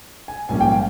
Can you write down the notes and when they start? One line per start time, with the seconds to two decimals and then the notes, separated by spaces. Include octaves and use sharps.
0.28 G#5
0.49 A#1 G#2 G3 A#3 C#4 G#5
0.61 G5
0.71 F5